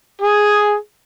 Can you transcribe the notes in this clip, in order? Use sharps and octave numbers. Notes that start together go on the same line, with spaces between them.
G#4